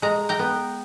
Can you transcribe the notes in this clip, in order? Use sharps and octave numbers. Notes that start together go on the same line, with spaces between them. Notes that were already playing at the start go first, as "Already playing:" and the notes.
G#3 A#5
G5 A#5
B3